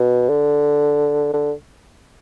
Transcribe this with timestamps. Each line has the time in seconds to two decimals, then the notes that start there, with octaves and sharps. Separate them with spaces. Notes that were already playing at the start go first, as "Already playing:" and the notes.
Already playing: B2
0.29 D3
1.34 D3